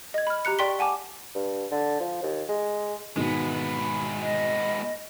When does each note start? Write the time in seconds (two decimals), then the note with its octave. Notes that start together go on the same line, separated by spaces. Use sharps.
0.14 D#5 G#6
0.27 B5 F6
0.45 G4 A#5 F#6 C#7
0.59 D5 G5 C6 C#6 B6 G7
0.79 F#5 G#5 A5 D6
1.35 G2
1.71 D3
2.00 F3
2.23 D#2
2.49 G#3
3.17 G#2 B2 D#3 G#3 B3
4.19 D#5